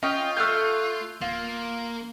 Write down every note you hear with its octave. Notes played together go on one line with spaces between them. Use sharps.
C#4 F4 D#5 G5
A3 A#3 F5 E6 F#6 G6
D1 A#3 F4